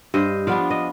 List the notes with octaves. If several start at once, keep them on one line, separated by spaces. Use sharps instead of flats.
G2 C5 D#5
F3 B3 D4 D5 F5
D#5